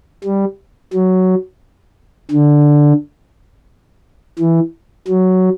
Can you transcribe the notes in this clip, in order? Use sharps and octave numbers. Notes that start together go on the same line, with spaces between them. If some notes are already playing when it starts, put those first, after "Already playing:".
G3
F#3
D3
E3
F#3